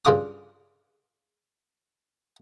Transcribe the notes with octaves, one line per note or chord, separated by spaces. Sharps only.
G2 C#3 D4 F4 D6 D#6